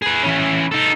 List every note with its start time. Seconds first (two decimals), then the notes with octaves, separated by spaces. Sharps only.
0.02 G#4 B4
0.23 E3 C#4
0.71 D#4 A4